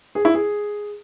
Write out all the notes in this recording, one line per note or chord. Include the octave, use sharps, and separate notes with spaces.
G#4
E4
G#4